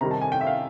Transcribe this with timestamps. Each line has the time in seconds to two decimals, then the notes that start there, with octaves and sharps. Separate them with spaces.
0.01 C3 D#3 G3 A#5
0.11 A5
0.21 G#5
0.32 G5
0.41 E5
0.47 F5